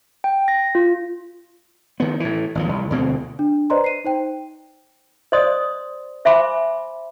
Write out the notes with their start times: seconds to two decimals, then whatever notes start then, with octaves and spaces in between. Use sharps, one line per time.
0.24 G5
0.48 A#6
0.75 F4
2.00 D#3 B3
2.20 A2 E3
2.55 G#1 D#2 F3
2.69 C2
2.90 D2 B2 D3 C4
3.39 D4
3.70 B4 C5 D5 D#5 A#5 C6
3.84 C7 D#7
4.04 D#4 C5 G5
5.32 C5 D5 D#5 C6 D#6
6.25 C5 E5 G#5 B5 C6 D6